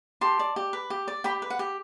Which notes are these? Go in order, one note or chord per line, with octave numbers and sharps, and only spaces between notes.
G4 A5 C6
D5
G4
B4
G4
D5
G4 G5 B5
B4
F#5
G4